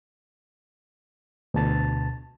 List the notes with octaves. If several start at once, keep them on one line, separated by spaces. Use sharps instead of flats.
D2 B2 A5 A6